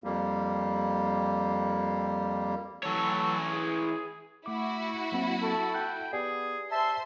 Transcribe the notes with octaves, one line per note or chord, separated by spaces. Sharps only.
F2 G3 A#3
E3 F#3 A4 C#5
G#4
A3 E4 F#4 D6
F#3 A#3 C4
A4
G5 F#6
B3 G4 G#4 D5 G#5
C5 E5 A5 C6